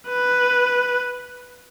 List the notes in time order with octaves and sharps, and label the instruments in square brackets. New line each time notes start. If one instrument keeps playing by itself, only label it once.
[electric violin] B4